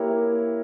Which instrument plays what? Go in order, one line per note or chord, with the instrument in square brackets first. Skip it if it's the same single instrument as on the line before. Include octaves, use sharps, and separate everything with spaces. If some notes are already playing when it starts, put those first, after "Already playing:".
Already playing: [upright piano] A#3 E4 G4 A#4 C#5